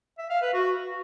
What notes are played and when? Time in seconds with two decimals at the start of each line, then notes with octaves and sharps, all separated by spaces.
0.18 E5
0.30 F5
0.42 B4
0.53 F#4